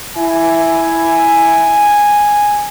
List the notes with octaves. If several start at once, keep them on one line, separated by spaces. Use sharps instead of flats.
E4 G#5